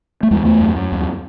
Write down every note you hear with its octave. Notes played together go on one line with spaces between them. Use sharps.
A3
E2 G#3
E2 A3
F#2
F#2
D#2